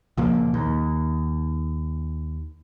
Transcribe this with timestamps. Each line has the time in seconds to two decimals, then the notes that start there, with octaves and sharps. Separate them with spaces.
0.17 C#2 A#2 F3 A#3
0.54 D#2